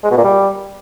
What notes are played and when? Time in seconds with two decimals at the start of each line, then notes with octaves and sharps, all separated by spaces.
0.04 G#3
0.11 B2
0.18 A#2
0.24 G3